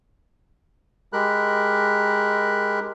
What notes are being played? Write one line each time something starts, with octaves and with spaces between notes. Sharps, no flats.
G#3 G4 A#4 B5 F#6